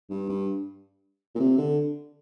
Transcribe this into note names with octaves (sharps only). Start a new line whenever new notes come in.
G2
G2
A#2
C3
D3